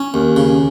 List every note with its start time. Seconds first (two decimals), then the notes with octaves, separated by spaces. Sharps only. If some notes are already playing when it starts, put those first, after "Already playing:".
Already playing: C#4
0.14 D#2
0.36 C#3